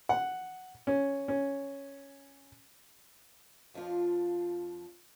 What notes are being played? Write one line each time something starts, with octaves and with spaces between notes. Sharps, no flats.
F#5
C#4
C#4
F2 F3 D4 F4